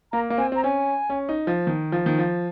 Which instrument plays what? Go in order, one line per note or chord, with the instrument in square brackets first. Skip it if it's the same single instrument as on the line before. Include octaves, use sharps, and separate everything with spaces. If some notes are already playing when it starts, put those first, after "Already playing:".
[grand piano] A#3 [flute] A#5
[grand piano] A#3
[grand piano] C4 [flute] G#5
[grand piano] C4 [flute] A#5
[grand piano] C#4 [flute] G#5
[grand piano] C#4
D#4
F3
D#3
F3
D#3
F3